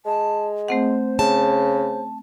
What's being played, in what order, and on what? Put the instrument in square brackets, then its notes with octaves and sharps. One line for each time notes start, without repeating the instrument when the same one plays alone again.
[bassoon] G#3 [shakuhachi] A5
[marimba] A3 C4 F#5 [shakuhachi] C5
[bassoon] C#3 [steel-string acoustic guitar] A5